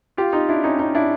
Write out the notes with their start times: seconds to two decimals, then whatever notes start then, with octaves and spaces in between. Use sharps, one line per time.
0.17 F4 G4
0.33 D#4 F4
0.49 D4 E4
0.64 C#4 D#4
0.79 C#4 D#4
0.95 D4 E4